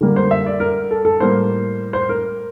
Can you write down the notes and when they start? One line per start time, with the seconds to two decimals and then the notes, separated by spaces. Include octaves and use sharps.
0.01 D3 G3 A#3
0.16 C5
0.31 E5
0.46 D5
0.60 A#4
0.91 A4
1.05 A4
1.20 A2 G3 A#3 C5
1.93 C5
2.09 A#4